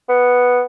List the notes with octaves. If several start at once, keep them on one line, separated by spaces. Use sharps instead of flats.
B3